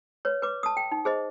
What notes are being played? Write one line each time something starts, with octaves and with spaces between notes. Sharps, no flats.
B4 C#5
B4 D6
A5 D#6
G5
D#4
G#4 C5 D#5